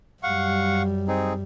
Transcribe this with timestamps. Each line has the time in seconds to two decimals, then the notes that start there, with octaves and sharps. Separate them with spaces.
0.23 F#2 G3 F5 F#5 C#6
1.08 C4 D#4 G#4